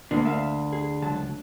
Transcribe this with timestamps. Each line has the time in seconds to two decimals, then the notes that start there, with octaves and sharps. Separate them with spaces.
0.11 D2 G#3 A#3 D4
0.25 E5 F5
0.73 G#4
1.02 C#2 F#3 A5